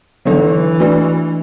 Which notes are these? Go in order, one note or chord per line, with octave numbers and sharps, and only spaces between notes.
D3 E3 F#3 D4 A4 D5
A3 D4 F#4 B4 D5